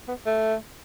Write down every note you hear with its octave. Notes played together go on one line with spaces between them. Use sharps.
B3
A3